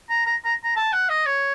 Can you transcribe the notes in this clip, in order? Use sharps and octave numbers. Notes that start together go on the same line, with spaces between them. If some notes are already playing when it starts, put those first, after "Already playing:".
A#5
A#5
A#5
A#5
A5
F#5
D#5
C#5